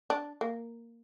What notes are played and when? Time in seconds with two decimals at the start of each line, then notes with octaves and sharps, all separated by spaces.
0.10 D4
0.41 A#3